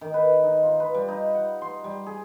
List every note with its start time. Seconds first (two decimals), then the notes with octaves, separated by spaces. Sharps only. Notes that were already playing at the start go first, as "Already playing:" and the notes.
0.01 D#3
0.14 B4
0.43 D#4
0.63 F4
0.80 B4
0.95 G3
1.08 D#4
1.35 F#5
1.62 C6
1.84 G3
2.06 G#4